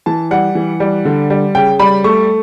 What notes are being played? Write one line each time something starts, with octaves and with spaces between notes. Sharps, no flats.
E3 A5
G3 F#5
E3
G3
D3
G3
C#3 G5
G3 B5
A3 C#6